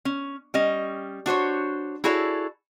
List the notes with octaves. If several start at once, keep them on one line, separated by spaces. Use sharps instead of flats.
C#4
G3 C#4 D#5
D4 F#4 C5 C#5
E4 F#4 G#4 A4 C#5 D5